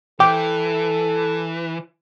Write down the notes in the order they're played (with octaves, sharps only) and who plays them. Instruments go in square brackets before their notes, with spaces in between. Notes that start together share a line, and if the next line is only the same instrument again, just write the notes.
[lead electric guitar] E3 [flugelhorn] A4 [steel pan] G5 [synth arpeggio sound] D6